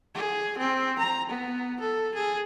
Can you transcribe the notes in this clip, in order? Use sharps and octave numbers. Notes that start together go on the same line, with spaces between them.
G#4
C4
A#5
B3
A4
G#4